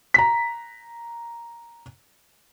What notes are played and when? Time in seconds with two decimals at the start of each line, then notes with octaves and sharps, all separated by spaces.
0.14 A#5 B6